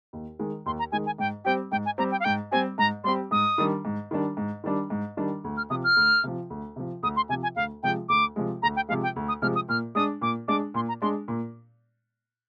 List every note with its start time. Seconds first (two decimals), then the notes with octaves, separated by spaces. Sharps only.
0.13 D#2
0.39 D#3 G#3
0.66 D#2 C6
0.79 A#5
0.92 D#3 G#3 G#5
1.06 G#5
1.18 G#2 G5
1.45 G3 C4 G4 G5
1.72 G#2 G5
1.86 G#5
1.98 G3 C4 G4 A#5
2.11 G5
2.20 F5
2.24 G#2 G5
2.52 G3 C4 G4 G#5
2.78 G#2 A#5
3.04 G3 C4 G4 C6
3.31 G#2 D#6
3.58 D#3 G3 D4
3.85 G#2
4.11 D#3 G3 D4
4.37 G#2
4.64 D#3 G3 D4
4.90 G#2
5.17 D#3 G3 D4
5.44 D2
5.57 F6
5.70 C3 F3 D#6
5.84 F6
5.96 D2
6.24 C3 F3
6.50 D2
6.76 C3 F3
7.03 D2 D#6
7.16 C6
7.29 C3 G#5
7.32 F3
7.43 G#5
7.56 D2 F5
7.83 C3 F3 G#3 G5
8.09 D2 D6
8.36 C3 F3 G#3
8.62 D2 A#5
8.76 G5
8.89 C3 F3 G#3 F5
9.03 G5
9.16 D2
9.28 D#6
9.42 C3 F3 G#3 F6
9.55 D#6
9.69 A#2 F6
9.95 G#3 D4 D#6
10.21 A#2 D6
10.48 G#3 D4 D6
10.74 A#2 C6
10.88 A#5
11.02 G#3 D4 C6
11.28 A#2